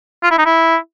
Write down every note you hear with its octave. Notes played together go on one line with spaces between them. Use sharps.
F4
E4
D#4
E4